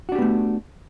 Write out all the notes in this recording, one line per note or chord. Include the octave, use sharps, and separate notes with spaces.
A3 B3 D4 F#4 G4